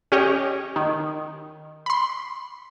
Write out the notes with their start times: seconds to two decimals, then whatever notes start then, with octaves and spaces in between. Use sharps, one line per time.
0.12 C#4 G4 C#5 D#5
0.76 D#3
1.86 B5 C6